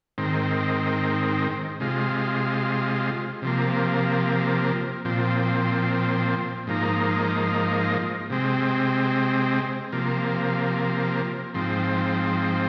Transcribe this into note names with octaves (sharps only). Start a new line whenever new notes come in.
G#2 D#3 C4
C3 G#3 F4
C3 F3 A#3
A#2 F3 C4
G#2 F3 A#3 D#4
C3 G#3 C4
C3 F3 A#3
G#2 F3 C4